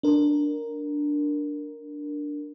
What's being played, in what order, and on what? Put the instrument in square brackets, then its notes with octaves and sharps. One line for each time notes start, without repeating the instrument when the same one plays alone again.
[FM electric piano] D4 A#4